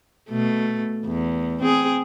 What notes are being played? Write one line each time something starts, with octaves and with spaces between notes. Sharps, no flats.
B2 A3
E2
C4 G#4